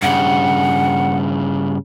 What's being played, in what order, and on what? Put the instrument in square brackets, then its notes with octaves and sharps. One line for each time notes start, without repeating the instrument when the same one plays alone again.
[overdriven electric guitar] G2 C#3 [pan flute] F#5